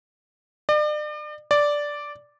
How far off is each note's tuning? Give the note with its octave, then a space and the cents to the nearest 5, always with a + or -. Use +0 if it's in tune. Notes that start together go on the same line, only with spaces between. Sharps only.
D5 +40
D5 -5